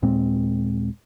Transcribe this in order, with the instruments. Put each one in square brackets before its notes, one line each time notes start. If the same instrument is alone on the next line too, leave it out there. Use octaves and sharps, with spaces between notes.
[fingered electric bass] D#2 A#2 G#3 C4